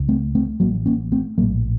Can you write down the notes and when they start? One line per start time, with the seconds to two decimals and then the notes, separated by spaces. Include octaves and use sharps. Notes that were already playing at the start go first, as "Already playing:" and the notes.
Already playing: C#2
0.08 A3 C4
0.35 A3 C4
0.60 A1 A2 F#3 A#3
0.86 A#3 C#4
1.12 A3 C4
1.38 A#1 A2 F#3 A#3